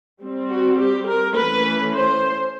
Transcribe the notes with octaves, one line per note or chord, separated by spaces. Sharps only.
G3 C4
F#4
G4
A#4
E3 A3 C#4 B4
C5